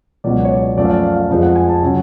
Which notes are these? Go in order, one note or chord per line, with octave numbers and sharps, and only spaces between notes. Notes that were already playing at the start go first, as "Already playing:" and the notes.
C#2 B2 F#3 D5
C#5
D5
F#2 F3 A3 D5
F5
D5
F5
F5
F2 F3 G#3
F#5
G#5
A5
C#3 F#3